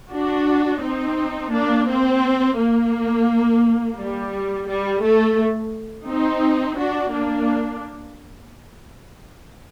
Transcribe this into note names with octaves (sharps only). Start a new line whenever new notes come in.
D4 F#4
C4 D#4
A#3 D4
C4
A#3
G3
G3
A3
C4 D#4
D4 F#4
A#3 D4